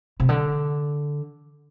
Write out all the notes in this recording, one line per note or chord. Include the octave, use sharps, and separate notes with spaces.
C3
D3